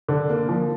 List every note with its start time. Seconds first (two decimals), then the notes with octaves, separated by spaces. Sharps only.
0.08 D3
0.30 A#3
0.49 F3